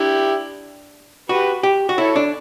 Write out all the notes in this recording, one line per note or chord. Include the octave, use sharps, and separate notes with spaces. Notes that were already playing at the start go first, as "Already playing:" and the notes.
Already playing: D4 E4 G4
F#4 G4 B4
G4
F#4
E4 A4 C#5
D4